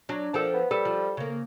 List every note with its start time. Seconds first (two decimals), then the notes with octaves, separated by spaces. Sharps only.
0.09 F#3 D4
0.34 A#2 F3 A4 G5
0.54 B3
0.71 G3 A4 B4
0.85 F3
1.17 C#3 A#3